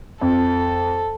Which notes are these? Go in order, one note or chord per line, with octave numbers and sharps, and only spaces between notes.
F2 A4